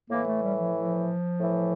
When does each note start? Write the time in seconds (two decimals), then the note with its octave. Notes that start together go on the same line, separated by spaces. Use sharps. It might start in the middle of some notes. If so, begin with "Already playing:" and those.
0.10 A2 E3 A#3
0.26 A3
0.43 G3
0.59 F3
0.75 F3
1.40 A2 E3